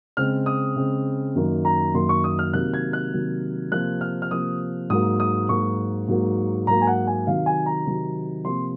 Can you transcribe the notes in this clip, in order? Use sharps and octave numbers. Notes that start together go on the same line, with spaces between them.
C#3 G#3 C4 F6
D#6
C#3 G#3 C4
F#2 D#3 A#3
A#5
F#2 D#3 A#3 C6
C#6
D#6
F6
C3 D#3 F#3 A#3 F#6
G#6
F#6
C3 D#3 F#3 A#3
C3 F3 A#3 F#6
F6
F6
C3 F3 A#3 D#6
G#2 F#3 A#3 D#6
D#6
G#2 F#3 A#3 C#6
G#2 F#3 A#3
G#2 F#3 A#3 A#5
G#5
F#5
G#5
C3 D#3 F#3 F5
G#5
A#5
C3 D#3 F#3
C3 F3 A#3 C6